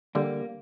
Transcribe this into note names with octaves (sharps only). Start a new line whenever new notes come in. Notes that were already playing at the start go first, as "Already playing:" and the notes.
D3 G3 A#3